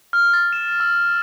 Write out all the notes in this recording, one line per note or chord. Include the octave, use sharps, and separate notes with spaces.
F6
A6
E7
E6